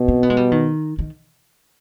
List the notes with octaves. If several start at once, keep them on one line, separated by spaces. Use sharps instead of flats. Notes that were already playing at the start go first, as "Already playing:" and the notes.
Already playing: B2
C4
B3
G#3
G3
D#3
D#3